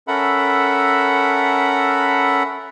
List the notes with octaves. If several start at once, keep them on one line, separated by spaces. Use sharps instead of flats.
C#4 A4 A#4 E5 F#5 B5